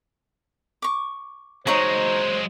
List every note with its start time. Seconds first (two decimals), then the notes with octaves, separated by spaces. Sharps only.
0.82 C#6 D6
1.67 F#3 G#3 D#4 C5 C#5 A#5